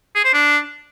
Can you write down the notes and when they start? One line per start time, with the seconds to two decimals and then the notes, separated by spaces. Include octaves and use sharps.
0.15 G#4
0.24 C5
0.34 D4